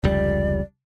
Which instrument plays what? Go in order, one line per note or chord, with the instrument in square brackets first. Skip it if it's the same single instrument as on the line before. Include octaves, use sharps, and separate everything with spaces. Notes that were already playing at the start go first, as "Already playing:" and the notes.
[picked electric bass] F1 C#2 G3 [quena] D5